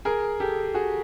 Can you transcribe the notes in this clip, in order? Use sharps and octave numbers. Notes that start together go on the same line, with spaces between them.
G#4 A#4
G4 A4
F#4 G#4